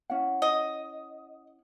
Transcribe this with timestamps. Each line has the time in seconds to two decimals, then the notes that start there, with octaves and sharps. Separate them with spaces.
0.10 C#4 E4 F#5
0.42 D#5